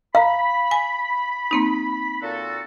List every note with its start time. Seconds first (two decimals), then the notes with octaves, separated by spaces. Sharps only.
0.15 F5 A#5 B5
0.71 G#5
1.51 A#3 C4 D#4
2.22 A#2 F#4 A4